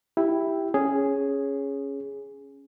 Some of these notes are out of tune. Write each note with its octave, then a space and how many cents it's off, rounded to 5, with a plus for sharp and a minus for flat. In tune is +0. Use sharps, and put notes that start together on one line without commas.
E4 +0 G4 +0 G5 +0
C#4 +0 G#4 +0 C#5 +0